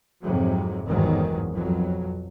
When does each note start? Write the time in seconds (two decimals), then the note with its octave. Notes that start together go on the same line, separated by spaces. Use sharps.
0.22 F2 G#2 C3 F#3
0.87 G1 E2 G#2 D#3 F#3
1.54 B1 F2 F#3